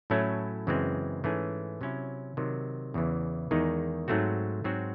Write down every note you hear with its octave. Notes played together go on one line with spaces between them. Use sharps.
A2 F#3 A3 C#4 E4
F#2 C#3 E3 G#3 C4
G#2 E3 A3 C#4 G#4
C3 F#3 C#4 E4
C3 D#3 F#3
E2 C#3 E3
E2 D#3 G#3 D#4
G#2 F#3 A3 C4 F#4
G#2 F#3 C4 F#4